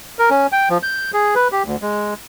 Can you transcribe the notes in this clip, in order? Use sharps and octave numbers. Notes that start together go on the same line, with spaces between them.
A#4
C#4
G5
F3
G6
G#4
B4
G4
D2
G#3